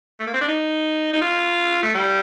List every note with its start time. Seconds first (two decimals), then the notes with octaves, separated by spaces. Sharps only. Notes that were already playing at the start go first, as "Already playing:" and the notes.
0.20 A3
0.27 A#3
0.34 C4
0.41 D4
0.49 D#4
1.13 D#4
1.21 F4
1.83 A3
1.95 G3